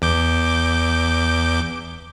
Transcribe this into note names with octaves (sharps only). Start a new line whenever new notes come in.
E2 D6 G6